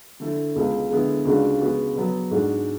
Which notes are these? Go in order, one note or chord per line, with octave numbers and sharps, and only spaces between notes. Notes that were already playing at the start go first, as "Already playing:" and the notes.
D3 A3 E4
C#2 B2 G#3
D3 G#3 B3 E4
C#2 C#3 G#3 D4 F#4
C#3 G#3 B3 F#4
B2 F#3 B3
G#2 G#3 D4 F#4